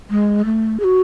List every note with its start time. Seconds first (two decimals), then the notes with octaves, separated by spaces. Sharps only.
0.10 G#3
0.45 A3
0.80 G#4
0.84 F#4